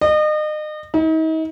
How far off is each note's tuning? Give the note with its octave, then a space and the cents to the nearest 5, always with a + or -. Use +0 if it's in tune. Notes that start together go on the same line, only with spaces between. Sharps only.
D#5 -35
D#4 +40